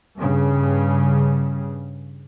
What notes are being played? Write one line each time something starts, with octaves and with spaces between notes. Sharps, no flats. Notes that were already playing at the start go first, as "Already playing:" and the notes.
G2 C#3